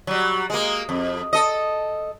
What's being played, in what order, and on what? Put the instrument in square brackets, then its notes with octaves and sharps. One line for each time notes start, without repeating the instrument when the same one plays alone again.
[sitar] F#3 G3
G#3 A#3
F2
A4 D#5